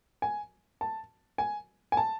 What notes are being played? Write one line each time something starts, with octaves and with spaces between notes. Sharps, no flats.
G#5
A5
G#5
G#5
A5